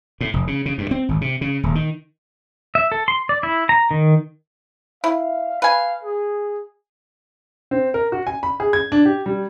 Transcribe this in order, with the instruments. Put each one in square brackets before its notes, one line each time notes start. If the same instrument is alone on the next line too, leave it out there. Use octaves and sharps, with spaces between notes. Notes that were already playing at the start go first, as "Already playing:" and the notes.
[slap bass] A2
F1
C#3
C#3
G2
C4
G#1
C3
C#3
D#1
D#3
[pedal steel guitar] E5
A4
C6
D5
E4
A#5
D#3
[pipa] E4 [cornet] F5
[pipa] B4 G#5 [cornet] F5
[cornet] G#4
[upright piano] C4
A#4
F#4
G#5
B5
G#4
G#6
D4
G4
G3